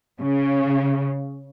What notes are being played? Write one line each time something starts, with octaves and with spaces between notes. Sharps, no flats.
C#3